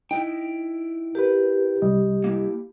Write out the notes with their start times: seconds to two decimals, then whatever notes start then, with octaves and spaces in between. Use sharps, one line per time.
0.11 D#4 E4 G5
1.15 G4 A#4 B4
1.82 C2 G3 D#5
2.24 A#3 E4